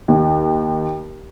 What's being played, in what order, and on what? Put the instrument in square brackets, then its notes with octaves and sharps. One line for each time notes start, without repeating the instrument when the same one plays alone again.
[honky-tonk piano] D#2